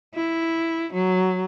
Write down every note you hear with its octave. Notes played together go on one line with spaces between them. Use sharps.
E4
F#3